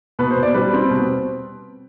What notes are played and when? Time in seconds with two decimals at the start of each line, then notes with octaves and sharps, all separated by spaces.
0.19 B2 B4
0.31 C5
0.37 B2
0.43 D5
0.54 G3 B4
0.73 C4
0.90 B2